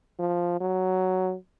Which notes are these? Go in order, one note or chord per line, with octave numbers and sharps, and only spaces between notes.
F3
F#3